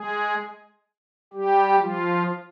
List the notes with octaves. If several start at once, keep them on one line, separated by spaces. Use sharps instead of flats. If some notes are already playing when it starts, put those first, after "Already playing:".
Already playing: G#3 G#4
G3 G4
F3 F4